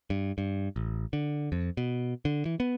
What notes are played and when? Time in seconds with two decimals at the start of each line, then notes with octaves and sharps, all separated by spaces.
0.10 G2
0.38 G2
0.76 A1
1.13 D3
1.52 F2
1.77 B2
2.25 D3
2.45 E3
2.60 B3